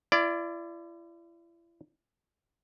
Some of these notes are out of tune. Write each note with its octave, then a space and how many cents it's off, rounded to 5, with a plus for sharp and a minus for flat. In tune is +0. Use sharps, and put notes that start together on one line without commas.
E4 +40 D5 +0